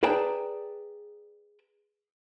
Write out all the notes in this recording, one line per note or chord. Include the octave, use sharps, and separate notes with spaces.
G#4 B4 D5 G5 A5 A#5